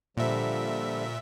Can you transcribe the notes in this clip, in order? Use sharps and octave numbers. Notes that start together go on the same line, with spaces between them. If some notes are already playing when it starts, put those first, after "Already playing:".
A#2 D3 F3 G3 E5